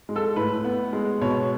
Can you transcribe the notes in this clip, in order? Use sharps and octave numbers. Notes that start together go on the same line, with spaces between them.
G#3
A4
A2 B4
B3
G#3
B2 C#5